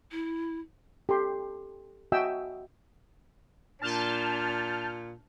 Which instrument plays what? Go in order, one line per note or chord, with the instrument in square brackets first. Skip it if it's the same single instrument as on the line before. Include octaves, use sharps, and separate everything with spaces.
[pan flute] E4
[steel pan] G4 A4 C6
F#4 D#5 E5 G5 G#5 E6
[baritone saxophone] A#2 [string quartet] D4 [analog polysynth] A5 F6 G6